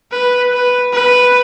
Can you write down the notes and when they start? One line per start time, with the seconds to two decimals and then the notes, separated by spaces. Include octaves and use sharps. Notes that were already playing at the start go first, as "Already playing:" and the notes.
0.12 B4
0.52 B4
0.93 B4